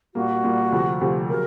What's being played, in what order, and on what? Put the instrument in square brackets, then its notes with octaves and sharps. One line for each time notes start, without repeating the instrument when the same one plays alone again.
[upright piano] A#2 G3 A#3 [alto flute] F#4
[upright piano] A#2 G3 A#3
D2 C3 F3
D2 C3 F3
[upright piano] C#3 F#3 [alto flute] A#4